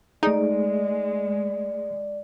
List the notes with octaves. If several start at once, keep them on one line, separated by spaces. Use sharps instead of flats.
G#3 A3 D#4 G#4 D5